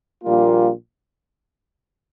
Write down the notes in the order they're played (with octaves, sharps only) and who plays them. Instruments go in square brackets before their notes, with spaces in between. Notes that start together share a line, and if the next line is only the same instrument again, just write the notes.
[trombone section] A#1 A#2 G3 A#3 F4